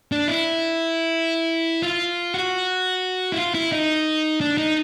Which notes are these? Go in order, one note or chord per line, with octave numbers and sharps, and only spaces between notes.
D4
E4
F4
F#4
E4
F4
E4
D#4
D4
D#4